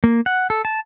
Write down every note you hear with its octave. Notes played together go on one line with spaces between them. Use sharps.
A#3
F#5
A4
A5